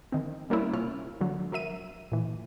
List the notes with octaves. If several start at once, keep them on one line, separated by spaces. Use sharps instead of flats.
D#3 C4
G3 A#3 C#4 E4
C3 C#4 F4 F6
D3 F#3
F#3 A#4 E5 D#7
A#2 E3